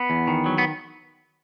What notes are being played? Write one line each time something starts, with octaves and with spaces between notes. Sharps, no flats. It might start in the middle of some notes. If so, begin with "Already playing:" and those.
Already playing: B3
E2
D#3
F#3
B3